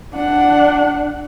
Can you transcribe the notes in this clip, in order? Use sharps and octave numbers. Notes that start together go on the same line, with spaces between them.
D4 F#5